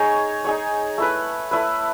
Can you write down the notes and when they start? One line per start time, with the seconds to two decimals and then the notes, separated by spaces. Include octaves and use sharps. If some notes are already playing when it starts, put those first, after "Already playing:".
Already playing: D#4 G#4 C#5
0.44 D#4 G#4 C#5
0.98 A3 E4 B4
1.51 A3 E4 B4